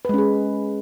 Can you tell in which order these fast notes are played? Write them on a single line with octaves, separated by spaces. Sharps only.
B4 G#3 C#4 G#4